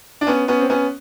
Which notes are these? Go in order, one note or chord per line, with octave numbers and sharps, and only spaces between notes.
D4
B3 C#4
B3 C#4
C4
B3 C#4